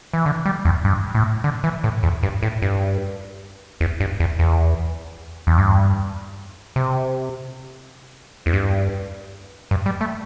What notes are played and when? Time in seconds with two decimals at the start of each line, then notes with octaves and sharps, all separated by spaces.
0.13 E3
0.26 D3
0.45 G3
0.65 E2
0.85 G2
1.15 A2
1.44 D3
1.64 E3
1.84 A2
2.03 E2
2.23 G2
2.43 A2
2.62 G2
3.80 E2
4.00 G2
4.20 E2
4.39 E2
5.47 E2
5.58 G2
6.76 C3
8.46 E2
8.53 G2
9.71 G2
9.86 G3
10.01 A3